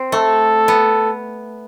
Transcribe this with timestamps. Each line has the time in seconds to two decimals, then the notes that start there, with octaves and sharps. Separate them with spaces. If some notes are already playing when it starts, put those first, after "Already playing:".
Already playing: C4
0.12 A3 A4
0.68 B3